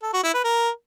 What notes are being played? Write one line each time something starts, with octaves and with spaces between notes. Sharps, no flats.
A4
F#4
E4
B4
A#4